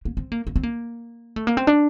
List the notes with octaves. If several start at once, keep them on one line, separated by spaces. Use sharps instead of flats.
A#3
C4
A#3
A#3
C4
A#3
A3
A#3
C4
D4